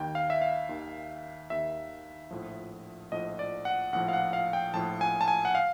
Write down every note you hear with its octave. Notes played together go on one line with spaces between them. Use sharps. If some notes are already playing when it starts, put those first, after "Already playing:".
Already playing: D#2 D#3 G5
F5
E5
F5
D#2 D#3
D#2 D#3 E5
A#1 A2 F3
A#1 A2 F3 D#5
D5
F#5
A#1 A2 F3 F#5
F5
F#5
F5
G5
A#1 A2 F3 A5
G#5
A5
G#5
F#5
F5